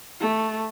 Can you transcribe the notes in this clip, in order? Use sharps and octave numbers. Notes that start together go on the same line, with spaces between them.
A3